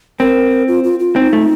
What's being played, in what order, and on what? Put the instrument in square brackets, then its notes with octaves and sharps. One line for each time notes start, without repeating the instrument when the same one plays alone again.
[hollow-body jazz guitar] C4 [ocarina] A#4
[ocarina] F4
F4
F4
[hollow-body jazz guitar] C4 [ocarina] D#4
[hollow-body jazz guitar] A3